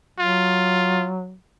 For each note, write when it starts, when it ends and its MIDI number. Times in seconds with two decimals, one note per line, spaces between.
0.19 1.34 54
0.19 1.09 65